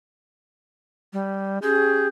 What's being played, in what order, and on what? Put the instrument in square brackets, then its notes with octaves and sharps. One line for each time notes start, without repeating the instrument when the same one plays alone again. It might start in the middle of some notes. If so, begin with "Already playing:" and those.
[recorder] G3
[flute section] C#4 G4 G6 [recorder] G#4